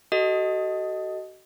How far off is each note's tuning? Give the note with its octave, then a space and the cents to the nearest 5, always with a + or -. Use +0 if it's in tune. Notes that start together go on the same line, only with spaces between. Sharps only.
F#4 +35 A4 +0 D#5 +0